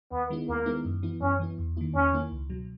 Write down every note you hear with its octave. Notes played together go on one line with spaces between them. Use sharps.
D#2 B3
D#3 G#3 B3 E4
D#2 A#3
D#3 G#3 B3 E4
F#2
E3 B3 E4
F#2 C#4
E3 B3 E4
E2
D#3 A#3 E4
E2 C#4
D#3 A#3 E4
C#2
B2 F#3